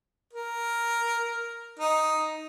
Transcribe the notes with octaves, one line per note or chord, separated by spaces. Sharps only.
A#4
D#4